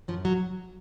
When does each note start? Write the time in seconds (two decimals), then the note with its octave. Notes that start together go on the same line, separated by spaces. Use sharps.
0.08 F#2 F3
0.25 F#3